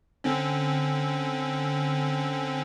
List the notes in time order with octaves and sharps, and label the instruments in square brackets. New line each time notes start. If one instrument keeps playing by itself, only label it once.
[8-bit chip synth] D3 C4 C#4